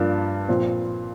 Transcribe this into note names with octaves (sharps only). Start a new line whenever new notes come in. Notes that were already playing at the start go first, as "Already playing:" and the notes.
Already playing: G2 F3 A#3 D4 F4
A#2 F3 C4 F4